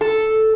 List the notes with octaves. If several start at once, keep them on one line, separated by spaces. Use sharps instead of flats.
A4